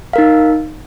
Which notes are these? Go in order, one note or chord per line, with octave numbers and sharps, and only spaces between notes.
D#4 A#4 F5